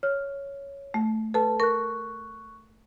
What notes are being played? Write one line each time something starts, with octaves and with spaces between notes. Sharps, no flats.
C#5 F6
A3
A4 B4 A5
A#4 C#6 F#6